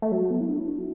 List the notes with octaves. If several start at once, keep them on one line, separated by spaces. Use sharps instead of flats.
A3
F#3
B3
E4
D4
E4
D4
F#4